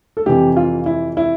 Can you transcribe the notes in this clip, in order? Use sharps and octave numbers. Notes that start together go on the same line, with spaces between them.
A4
F2 C3 E3 G4
F4
E4
E4